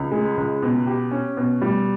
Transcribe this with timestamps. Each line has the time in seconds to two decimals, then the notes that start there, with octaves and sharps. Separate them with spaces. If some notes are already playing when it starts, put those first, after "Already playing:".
Already playing: C#2
0.11 G#3
0.37 C#2
0.62 B2
0.86 G4
1.11 C#4
1.37 B2
1.61 G3